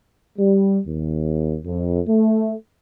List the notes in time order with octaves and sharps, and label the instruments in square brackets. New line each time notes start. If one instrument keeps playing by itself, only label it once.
[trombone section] G3
D#2
F2
A3